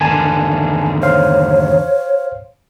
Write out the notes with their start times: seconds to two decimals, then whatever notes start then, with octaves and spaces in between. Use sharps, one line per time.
0.01 E2 D3 D#3 G#5 A5
1.03 C5 C#5 F5